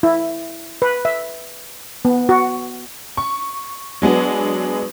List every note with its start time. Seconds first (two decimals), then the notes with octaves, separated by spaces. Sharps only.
0.03 E4
0.82 B4
1.05 E5
2.05 B3
2.29 F#4
3.17 C#6
4.02 F#3 G#3 B3 D4